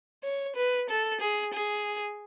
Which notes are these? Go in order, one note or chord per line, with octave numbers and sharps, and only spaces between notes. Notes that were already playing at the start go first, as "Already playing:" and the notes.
C#5
B4
A4
G#4
G#4